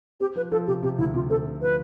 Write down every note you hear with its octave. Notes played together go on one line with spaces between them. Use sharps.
C4 G4
F3 B4
F3 A4
C3 G4
C3 G4
D2 E4
C3 F4
C4 A4
C3
F3 B4